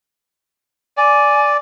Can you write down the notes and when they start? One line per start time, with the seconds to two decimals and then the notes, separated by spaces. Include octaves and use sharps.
0.97 D5 G#5